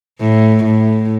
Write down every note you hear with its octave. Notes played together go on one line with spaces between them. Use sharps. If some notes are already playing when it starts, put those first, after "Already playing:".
A2
A2